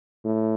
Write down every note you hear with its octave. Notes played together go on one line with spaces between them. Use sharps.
A2